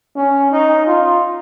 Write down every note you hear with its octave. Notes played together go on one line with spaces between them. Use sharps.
C#4
D#4
F4